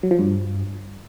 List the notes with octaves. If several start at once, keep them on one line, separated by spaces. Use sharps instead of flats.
F#3
F3
G2